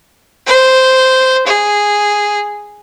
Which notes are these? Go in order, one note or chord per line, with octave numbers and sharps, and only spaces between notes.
C5
G#4